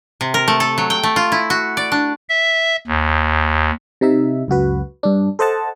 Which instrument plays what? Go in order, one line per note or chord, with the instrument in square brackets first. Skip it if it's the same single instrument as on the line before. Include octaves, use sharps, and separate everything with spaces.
[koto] C3
A#4
A3
A4
F#3
G5
A3
F4
E4
F#4
D5
D4
[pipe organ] E5
D#2
[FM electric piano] C3 D#4 E5
C#2 F#2 F#4 B4
G2 D4
A4 C5 D#5 F#5 A5